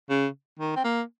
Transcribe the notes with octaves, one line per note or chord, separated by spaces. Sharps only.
C#3
D#3
C4
A#3